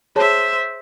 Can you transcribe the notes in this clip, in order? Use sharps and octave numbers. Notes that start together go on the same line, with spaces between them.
G#4 C5 C#5 E5 A5